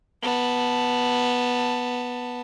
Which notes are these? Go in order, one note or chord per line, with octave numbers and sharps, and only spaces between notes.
B3 A5